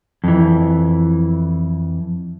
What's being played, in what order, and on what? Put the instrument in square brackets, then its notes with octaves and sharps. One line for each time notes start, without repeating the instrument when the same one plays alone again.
[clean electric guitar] F2 E3